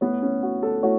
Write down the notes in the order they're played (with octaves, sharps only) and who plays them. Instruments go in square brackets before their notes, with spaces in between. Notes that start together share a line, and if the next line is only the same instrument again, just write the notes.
[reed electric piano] A3 E4 C#5 [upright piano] B3
[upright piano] C#4
F#4
A4
[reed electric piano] A3 E4 C#5 [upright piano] F#4